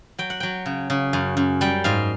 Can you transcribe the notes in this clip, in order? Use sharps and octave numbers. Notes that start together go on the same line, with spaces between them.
F#3 G5
F#5
F#3 G5
C#3
C#3
F#2
F#2
G3 G5
G#2 F5